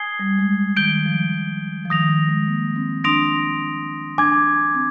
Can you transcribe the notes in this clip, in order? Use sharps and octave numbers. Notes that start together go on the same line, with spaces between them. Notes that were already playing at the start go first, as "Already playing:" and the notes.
Already playing: G#5 D#6 G#6 C7 G7
G3
G#3
D#3 G6 D7 G7
F3
F3
D#3 D#6 A#6 F7
F3
G#3
A#3
C4
D4 C6 D#6 A#6 D7 F7
D4 G#5 D6 G#6
C4